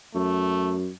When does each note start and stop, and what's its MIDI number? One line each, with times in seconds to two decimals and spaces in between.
0.14 0.90 42
0.14 0.75 57